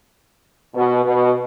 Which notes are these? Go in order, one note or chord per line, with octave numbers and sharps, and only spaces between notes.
B2
B2